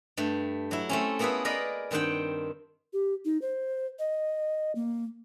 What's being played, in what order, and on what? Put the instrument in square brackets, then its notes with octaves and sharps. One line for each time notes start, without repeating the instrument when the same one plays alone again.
[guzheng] G2 A3
F#3 E4
A3 C4 C#4
A#3 B3 E4 G#4 A4 B4
A#4 B4 D5 D#5 F5 B5
G2 D#3 C4 F#5 G5
[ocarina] G4
D#4
C5
D#5
A#3